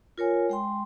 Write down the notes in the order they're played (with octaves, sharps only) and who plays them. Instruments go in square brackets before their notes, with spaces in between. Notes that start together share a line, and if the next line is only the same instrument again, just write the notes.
[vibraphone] F4 A#4 C#5 G#5
G#3 G5 C6